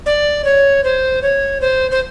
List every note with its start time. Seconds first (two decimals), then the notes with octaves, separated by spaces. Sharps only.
0.06 D5
0.45 C#5
0.84 C5
1.22 C#5
1.61 C5
1.91 C5